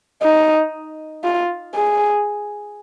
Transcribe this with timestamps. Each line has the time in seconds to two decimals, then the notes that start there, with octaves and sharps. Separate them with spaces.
0.23 D#4
1.24 F4
1.75 G#4